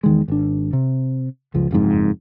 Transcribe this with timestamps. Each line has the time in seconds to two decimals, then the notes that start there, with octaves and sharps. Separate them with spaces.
0.03 E2 D#3 G#3
0.28 G#1 D4
0.73 C3
1.54 F#1 C#2 F3
1.71 F#1 F2 G#2